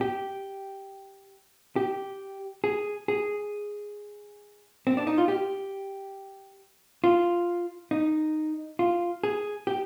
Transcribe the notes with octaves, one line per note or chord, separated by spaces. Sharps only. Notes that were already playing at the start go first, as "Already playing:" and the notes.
G4
G4
G#4
G#4
C4
D4
D#4
F4
G4
F4
D#4
F4
G#4
G4